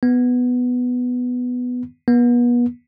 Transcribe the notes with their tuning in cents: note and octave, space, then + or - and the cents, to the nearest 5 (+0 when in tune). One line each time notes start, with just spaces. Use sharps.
B3 +5
B3 -35